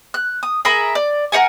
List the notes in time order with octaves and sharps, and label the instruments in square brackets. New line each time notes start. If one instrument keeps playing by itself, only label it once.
[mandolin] F#6
D#6
G#4 A#4 E5 B5
D5
A#4 C#5 F#5 G#5